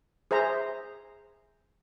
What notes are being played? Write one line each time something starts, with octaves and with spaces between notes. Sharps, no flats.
G#4 C5 E5 A#5